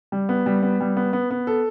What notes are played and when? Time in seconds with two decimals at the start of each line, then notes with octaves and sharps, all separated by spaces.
0.12 G3
0.29 B3
0.46 G3
0.63 B3
0.81 G3
0.97 B3
1.13 B3
1.31 B3
1.47 A4